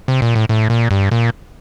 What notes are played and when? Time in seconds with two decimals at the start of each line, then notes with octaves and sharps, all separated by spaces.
0.08 C3
0.22 A#2
0.35 A2
0.49 A2
0.70 A#2
0.91 G2
1.12 A#2